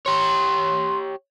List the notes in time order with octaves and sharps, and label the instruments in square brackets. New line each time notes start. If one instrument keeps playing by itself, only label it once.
[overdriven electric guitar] G4 C#5 [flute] C6